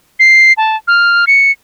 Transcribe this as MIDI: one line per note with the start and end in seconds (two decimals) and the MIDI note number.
0.19 0.53 96
0.57 0.76 81
0.88 1.25 89
1.27 1.51 97